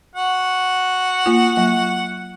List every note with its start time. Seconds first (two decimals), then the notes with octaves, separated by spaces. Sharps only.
0.15 F#4 F#5
1.26 A#3 F4
1.57 F#3 A#3